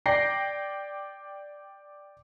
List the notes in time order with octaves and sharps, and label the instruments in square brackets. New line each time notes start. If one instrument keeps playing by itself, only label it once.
[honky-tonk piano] D5 G5 A#6 C7